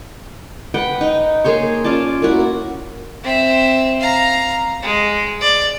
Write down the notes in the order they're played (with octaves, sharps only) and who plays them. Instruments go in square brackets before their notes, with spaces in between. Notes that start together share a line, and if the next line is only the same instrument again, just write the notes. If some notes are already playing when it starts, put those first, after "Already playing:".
[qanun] B4 F#5 G5
D#4
A#3 G#4 C5 C#5
C#4 F4 D5 A5
A#3 E4 F#4
[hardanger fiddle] C4 E5
F5 A#5
G#3
D5